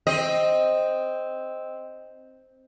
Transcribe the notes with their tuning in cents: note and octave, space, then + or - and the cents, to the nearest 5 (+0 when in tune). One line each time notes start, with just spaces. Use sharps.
C4 +0 D#5 +0